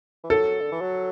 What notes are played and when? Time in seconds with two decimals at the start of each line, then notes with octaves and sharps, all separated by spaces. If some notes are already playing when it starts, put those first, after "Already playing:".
0.24 E3
0.30 F#3 A4
0.61 D3
0.72 E3
0.81 F#3